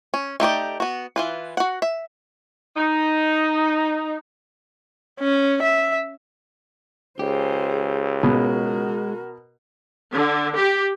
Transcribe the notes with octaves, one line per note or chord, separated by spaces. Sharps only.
C#4
A3 D#4 G4 D5
B3 F#4
E3 F4 B4
F#4 F#5
E5
D#4
C#4
E5
C#2 G4 G#4 C5
B2 G#3 F#4 A#4
D3
G4